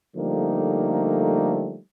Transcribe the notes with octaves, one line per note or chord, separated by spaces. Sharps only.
D3 F3 G3 A3 A#3 D#4